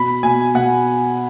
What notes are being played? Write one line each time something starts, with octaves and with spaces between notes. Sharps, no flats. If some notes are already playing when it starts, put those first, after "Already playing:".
Already playing: B2 B5
B2 G#5
B2 F#5